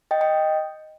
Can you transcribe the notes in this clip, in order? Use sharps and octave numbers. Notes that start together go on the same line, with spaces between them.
D#5 G5
D#5 G5